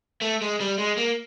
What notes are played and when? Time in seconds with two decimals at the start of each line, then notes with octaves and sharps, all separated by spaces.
0.22 A3
0.42 G#3
0.61 G3
0.79 G#3
0.98 A#3